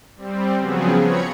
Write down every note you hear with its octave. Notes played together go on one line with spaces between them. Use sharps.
G3 C4
C#3 F3 F#3 B3 C4 G#4
F3 C#5 A#5 B5 G#6 C#7